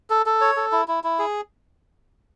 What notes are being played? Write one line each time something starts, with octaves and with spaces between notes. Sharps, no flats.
A4
A4
C#5
A4
E4
E4
E4
G#4